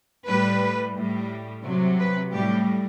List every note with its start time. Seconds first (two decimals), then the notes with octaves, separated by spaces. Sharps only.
0.27 A2 G3 B4
0.96 A2 G3
1.64 C3 F#3
1.99 B4
2.33 A2 G3 G4